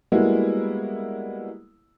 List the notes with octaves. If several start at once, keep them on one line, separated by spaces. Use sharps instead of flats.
G3 G#3 A#3 B3 E4 F#4